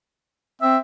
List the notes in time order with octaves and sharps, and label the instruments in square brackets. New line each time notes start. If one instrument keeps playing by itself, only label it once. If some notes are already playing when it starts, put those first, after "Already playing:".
[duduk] C4 [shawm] E5